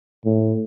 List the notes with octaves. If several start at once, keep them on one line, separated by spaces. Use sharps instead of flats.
A2